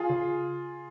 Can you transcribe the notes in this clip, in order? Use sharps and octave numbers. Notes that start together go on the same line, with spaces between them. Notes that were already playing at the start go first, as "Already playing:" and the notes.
Already playing: F4 G#4
C#3